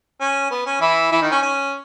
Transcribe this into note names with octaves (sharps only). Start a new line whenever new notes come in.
C#4
B3
C#4
E3 E4
E3 E4
D#3 D#4
C#4
C#4